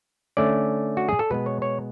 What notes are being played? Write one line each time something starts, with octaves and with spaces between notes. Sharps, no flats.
D3 A3 C#4 D5
F#4
G#4
A4
B2 G#3 B3 B4
C#5
C#5